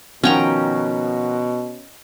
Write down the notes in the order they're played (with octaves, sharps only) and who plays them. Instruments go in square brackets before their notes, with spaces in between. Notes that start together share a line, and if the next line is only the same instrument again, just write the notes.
[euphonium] B2 [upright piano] D#3 F3 F#4 [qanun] C#4 G5 A#5